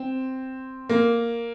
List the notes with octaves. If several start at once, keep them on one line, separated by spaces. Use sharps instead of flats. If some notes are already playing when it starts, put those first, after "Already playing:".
Already playing: C4
A#3